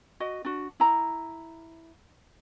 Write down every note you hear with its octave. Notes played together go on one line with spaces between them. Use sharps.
F#4 D#5
D4 F#4
E4 A#5